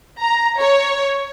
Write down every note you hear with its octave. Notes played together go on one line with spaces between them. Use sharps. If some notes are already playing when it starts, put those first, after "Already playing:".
A#5
C#5